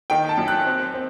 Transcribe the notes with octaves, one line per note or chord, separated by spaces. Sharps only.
D#3 G5
A5
F#2
F#6
C4
C4